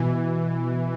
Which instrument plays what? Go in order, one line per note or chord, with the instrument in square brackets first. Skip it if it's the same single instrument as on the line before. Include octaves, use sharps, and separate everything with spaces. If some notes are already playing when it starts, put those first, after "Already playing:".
Already playing: [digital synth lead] B2 [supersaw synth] E3